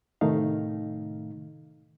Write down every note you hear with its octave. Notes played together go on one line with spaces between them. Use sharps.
A2 C3 D#3 A3 D#4 F5